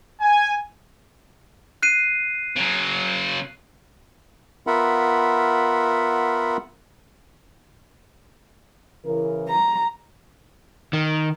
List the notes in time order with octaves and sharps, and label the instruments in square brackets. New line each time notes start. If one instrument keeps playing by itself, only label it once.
[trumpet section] G#5
[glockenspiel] F#6 C7 D#7
[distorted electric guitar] C#3 F#3
[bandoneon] B3 F4 A#4 E5 F#5 B5
[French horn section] C#3 E3 A#4
[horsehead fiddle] A#5
[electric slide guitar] D#3